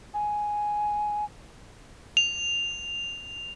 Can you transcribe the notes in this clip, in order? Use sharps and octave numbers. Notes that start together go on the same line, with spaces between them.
G#5
F7